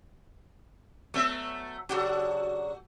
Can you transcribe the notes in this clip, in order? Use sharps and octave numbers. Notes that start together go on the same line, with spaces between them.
F#3 A3 B3 E5
C#3 F#3 D4 F#4 A4